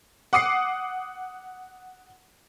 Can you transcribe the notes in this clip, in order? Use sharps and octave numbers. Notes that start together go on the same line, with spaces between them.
F#5 D6 D#6 C7 C#7